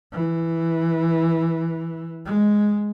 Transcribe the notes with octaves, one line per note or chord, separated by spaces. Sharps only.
E3
G#3